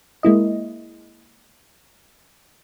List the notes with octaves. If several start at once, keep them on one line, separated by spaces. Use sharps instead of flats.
G#3 A#3 E4 D#5